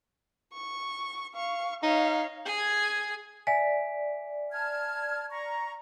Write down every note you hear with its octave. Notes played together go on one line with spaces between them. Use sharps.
C#6
F5 C#6
D#4 C#5 F5
G#4 G#5
D5 E5 G#5 B6
A5 F6 G#6
A#5 C#6